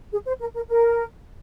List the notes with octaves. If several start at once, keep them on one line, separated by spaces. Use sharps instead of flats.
G#4
C5
A#4
A#4
A#4